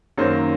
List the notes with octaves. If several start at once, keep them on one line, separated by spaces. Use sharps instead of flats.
F#2 D#3 F#3 A#3 C5